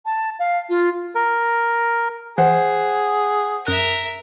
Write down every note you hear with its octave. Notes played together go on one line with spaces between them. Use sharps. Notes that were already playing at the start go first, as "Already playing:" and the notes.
A5
F5
F4
A#4
E3 G#4 C5 F#5
F#2 A#4 E5 F#6 D#7